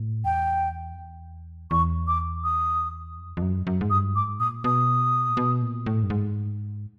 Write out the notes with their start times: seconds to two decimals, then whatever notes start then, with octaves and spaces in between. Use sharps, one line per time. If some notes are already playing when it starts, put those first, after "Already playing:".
Already playing: A2
0.25 E2 G5
0.93 F2
0.98 E2
1.71 E2 C#6
2.07 D6
2.44 D#6
3.17 F2
3.37 F2
3.42 F#2
3.67 F#2
3.81 G#2
3.90 G2 D#6
4.16 G#2 D6
4.40 A#2 D#6
4.64 B2 D#6
5.29 A#2
5.37 B2
5.62 A#2
5.86 A2
6.03 G2
6.10 G#2